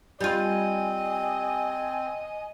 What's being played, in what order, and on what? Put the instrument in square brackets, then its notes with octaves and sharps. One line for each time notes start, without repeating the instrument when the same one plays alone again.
[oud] G3 F4 [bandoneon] C4 [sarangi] D#5 [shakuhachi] G#5